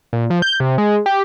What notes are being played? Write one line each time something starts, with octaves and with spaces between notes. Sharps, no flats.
A#2
F3
G6
C3
G#3
G4